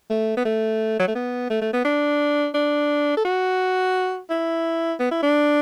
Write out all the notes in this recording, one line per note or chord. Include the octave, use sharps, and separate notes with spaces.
A3
B3
A3
F#3
A3
B3
A3
A3
B3
D4
D4
A4
F#4
E4
B3
E4
D4